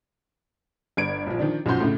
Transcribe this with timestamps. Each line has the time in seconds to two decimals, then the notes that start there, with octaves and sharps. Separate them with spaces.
0.97 G1 G#6 D7
1.27 A#1 F3
1.39 D#3 F3 D4
1.66 B1 F#2 F3 F#4 C6 G6
1.80 A2 C#3